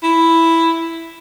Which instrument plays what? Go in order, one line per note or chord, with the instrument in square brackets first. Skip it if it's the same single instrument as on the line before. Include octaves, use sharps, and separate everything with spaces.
[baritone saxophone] E4